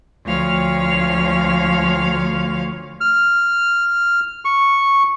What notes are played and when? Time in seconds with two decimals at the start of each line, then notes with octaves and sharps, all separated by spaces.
0.24 D2 F3 C#5 F5 F6
3.01 F6
4.45 C#6